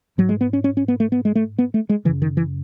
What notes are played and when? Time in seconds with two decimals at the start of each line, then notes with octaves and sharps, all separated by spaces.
0.18 G#2 F#3
0.29 G#3
0.41 B3
0.53 C#4
0.64 C#4
0.77 C#4
0.88 B3
1.00 A3
1.12 B3
1.25 G#3
1.35 A3
1.58 B3
1.74 A3
1.89 G#3
2.05 C#3 E3
2.08 F#2
2.22 D#3
2.37 E3